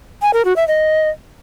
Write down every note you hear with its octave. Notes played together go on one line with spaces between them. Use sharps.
G#5
A#4
F#4
E5
D#5